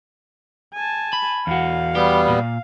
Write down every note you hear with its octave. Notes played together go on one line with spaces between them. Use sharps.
G#5 A5
B5
E2 F#4 F5
G3 B3 G4
A#2